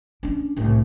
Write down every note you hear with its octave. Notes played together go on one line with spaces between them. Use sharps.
C#4 D4
C2 A2